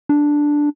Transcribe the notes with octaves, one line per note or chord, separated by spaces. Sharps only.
D4